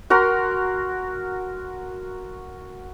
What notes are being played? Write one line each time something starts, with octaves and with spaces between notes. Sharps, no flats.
F#4 A#4 A#5 C6